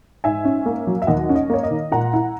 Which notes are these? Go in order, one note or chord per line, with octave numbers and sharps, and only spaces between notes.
G#2 E5 G#5
C#4
A#3
F#3
E5
D#2 D#5 F#5
C#4
D#5
A#3 C#5
D#5
D#3
A#2 F#5 A#5
E4